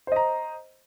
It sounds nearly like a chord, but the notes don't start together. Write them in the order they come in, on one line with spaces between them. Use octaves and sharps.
C5 D#5 A#5